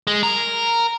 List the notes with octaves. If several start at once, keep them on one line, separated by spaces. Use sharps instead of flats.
G#3
A#4